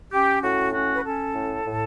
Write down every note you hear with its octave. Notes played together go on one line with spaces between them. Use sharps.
C#4 G4
A2 F#4
C#4 F#4
B4
C#4 A4
A2
A2